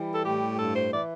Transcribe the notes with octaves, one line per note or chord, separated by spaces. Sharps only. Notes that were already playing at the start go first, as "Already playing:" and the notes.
Already playing: E3 G3
A4
A2 G4
G2 A4
C5
E3 D5